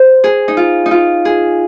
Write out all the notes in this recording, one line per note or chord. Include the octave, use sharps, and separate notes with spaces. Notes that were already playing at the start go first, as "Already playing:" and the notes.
Already playing: C5
G#4
D#4
F4
D#4
F4
G#4